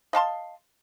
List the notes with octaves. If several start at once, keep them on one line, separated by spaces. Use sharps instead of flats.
D#5 F5 A5 C6